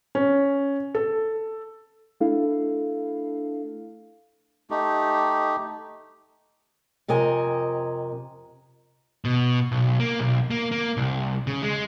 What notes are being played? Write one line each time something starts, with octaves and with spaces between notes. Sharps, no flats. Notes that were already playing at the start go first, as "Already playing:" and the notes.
C#4
A4
A3 D4 E4 A4 F5
A3 D#4 G4
F2 C3 A#4 D#5 G#5
B2
B1
A#3
B1
A#3
A#3
C2
C#3
G#3